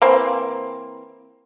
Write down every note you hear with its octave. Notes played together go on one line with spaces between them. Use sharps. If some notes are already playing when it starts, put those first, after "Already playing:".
E3 A#3 C4